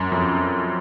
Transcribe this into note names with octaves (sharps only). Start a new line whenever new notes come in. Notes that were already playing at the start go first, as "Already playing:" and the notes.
Already playing: F#2
F2